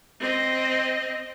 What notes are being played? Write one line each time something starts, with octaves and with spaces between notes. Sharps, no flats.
C4 D#5